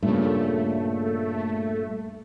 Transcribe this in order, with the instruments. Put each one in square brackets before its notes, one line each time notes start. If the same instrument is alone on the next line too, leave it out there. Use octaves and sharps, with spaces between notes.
[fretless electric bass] G2 A#2 C#3 [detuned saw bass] A3